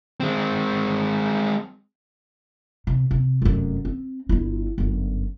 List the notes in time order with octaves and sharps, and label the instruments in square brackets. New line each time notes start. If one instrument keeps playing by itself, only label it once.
[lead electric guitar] G#3 C4
[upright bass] C3
C3
F1 F#2
C4
G1 E4
G1 F#2